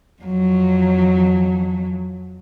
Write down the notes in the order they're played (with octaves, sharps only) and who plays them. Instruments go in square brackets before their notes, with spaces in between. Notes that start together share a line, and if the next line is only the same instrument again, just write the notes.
[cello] F2 F#3